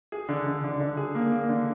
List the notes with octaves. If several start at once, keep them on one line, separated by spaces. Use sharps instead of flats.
G#4
D3
D3
D3
D3
G#4
A#3
A#3
D3